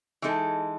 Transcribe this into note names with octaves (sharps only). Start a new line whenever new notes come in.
E3 G#3 D#4 A4